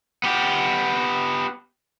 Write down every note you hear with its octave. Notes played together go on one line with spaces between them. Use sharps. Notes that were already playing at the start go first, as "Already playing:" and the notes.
B3 G4